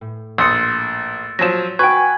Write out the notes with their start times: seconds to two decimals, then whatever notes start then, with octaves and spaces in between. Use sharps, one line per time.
0.01 A2
0.38 A#1 C6 D#6 E6 A6 C#7
1.39 F3 F#3 A#6 E7
1.79 F#4 B4 G5 G#5 C#6 G#6